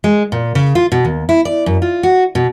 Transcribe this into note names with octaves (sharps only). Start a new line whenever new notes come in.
G#3
A#2
C#3
F4
B2
D#2
E4
D5
F#2
F4
F#4
B2